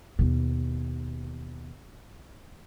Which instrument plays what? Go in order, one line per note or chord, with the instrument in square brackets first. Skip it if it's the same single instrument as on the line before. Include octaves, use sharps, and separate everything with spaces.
[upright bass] D#2 B2